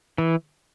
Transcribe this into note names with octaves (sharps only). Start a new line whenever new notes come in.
E3